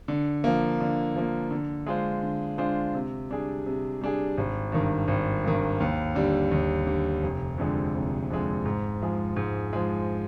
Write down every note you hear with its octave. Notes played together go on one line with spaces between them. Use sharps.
D3
F3 A#3
D3
F3 A#3
D3
G#3 D4 F4 C5
D3
G#3 D4 F4 C5
C3
G3 D4 G#4
C3
G3 D4 G#4
G#1
G2 D#3
G#1
G2 D#3
D#2
D3 G3
D#2
D3 G3
F1
F2 D3 G#3
F1
F2 D3 G#3
G#2
F3 G#3
G#2
F3 G#3